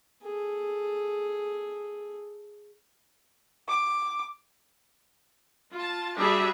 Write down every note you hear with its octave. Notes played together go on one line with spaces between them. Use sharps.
G#4 A4
D6
F4 A5
G3 D4 F#4 G#4 E5